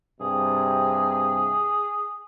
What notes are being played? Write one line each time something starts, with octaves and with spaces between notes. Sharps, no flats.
G2 C3 G#4